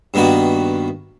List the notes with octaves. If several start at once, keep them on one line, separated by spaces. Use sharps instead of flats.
G2 D#3 A#3 B3 F#4